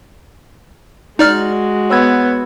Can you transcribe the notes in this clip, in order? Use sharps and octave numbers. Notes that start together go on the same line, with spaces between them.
G#3 D#4 F#4 D5 F6
B3 C#5 E6 G#6